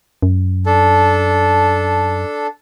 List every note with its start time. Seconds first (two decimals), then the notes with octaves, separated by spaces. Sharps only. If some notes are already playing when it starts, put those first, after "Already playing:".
0.23 F#2
0.66 D4 A4